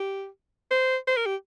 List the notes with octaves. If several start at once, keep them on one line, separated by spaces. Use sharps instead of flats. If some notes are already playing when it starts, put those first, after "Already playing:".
Already playing: G4
C5
C5
A#4
G4